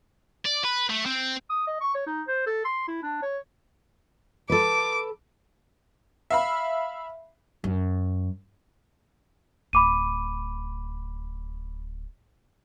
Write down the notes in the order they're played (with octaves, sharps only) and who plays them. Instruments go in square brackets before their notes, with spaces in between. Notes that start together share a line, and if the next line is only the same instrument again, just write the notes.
[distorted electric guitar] D5
B4
A3
C4
[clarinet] D#6
D#5
C#6
C#5
D#4
C5
A4
C6
E4
D4
C#5
[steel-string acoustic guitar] A4 B4 [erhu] D6
[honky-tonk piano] E5 F5 B5
[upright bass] F#2
[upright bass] D1 [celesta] B5 D6 D#7